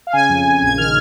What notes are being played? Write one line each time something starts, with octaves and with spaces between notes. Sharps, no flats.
F5
C#3 G#5
F2
C#3
A#1 G#6
D#3 F6